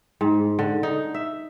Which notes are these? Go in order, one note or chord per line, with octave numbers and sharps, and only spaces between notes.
G#2
D3
D#4
E5